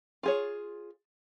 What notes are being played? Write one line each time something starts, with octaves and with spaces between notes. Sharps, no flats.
F4 G#4 C#5